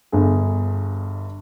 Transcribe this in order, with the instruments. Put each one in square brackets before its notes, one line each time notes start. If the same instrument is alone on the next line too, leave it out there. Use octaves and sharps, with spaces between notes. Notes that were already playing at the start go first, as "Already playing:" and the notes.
[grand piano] G1 G2 G#4